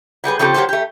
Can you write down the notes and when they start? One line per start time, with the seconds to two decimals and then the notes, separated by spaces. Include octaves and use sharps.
0.24 F#3 G3 G#4 B4
0.39 C#3 F3 C4 G4 A4
0.54 F#3 A#3 G4 A4 C5
0.69 A3 G4